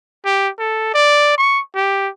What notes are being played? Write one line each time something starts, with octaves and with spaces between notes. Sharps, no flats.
G4
A4
D5
C#6
G4